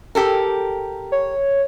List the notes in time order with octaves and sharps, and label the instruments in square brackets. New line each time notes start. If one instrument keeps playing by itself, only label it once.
[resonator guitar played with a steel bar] G4 A4 A#4
[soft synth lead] C#5